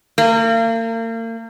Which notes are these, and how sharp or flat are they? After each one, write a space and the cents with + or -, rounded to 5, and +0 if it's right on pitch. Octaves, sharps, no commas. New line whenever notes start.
A#3 -40